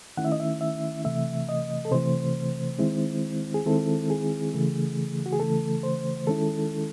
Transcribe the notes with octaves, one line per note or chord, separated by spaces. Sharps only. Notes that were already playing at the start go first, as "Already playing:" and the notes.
D#3 A3 C#4 E4 F#5
E5
D#5
E5
E5
C3 E3 A3 E5
D#5
A4
C3 E3 A3 C5
D#3 G#3 C4 E4
G#4
D#3 G#3 C4 E4 A4
G#4
C#3 E3 A3
F#4
G#4
C#3 E3 A3 A4
C5
D#3 G#3 C#4 E4 A4